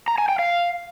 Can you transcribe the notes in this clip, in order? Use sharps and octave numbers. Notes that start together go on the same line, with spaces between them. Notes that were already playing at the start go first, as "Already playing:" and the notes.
A#5
G#5
G5
F5